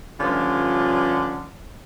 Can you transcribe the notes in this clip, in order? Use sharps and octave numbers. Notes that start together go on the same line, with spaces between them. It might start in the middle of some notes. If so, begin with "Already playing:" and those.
G2 D3 F3 A3 C#4 F4